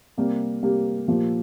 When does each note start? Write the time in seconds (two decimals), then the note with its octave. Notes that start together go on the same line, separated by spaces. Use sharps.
0.17 C3 G3 A#3 G4
0.62 C3 G3 A#3 G4
1.07 A#2 F3 A#3 G4